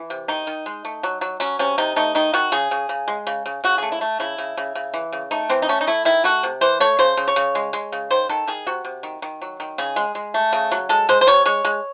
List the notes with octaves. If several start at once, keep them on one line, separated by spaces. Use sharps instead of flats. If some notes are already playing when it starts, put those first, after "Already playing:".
Already playing: E3
C3
D#3 D#4
D#3
G#3
A3
F#3
F#3
F#3 C#4
C3 C#4
C3 D#4
A3 D#4
D#3 D#4
D#3 F#4
C#3 G#4
C#3
C#3
G#3
C#3
C#3
C#3 F#4
A3 G#4
E4
A3
C#3 E4
C#3
C#3
C#3
E3
C#3
A3 D#4
E3 C4
D#4
A3 C#4
D#4
A3 E4
D#3 E4
A3 F#4
C3
E3 C5
A3 C#5
C#3 C5
C#3
C#5
C#3
G#3
G#3
C#3
D#3 C5
D#3 A4
D#3 G#4
C3 F#4
C3
D#3
D#3
F#3
D#3
C#3 G#4
G#3
G#3
A3
C#3
F#3
G#3 A4
G#3 C5
C5
C3 C#5
G#3 C#5
G#3